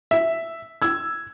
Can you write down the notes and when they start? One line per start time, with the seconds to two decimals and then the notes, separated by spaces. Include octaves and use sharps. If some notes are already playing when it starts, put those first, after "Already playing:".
0.11 E5
0.82 E6 G#6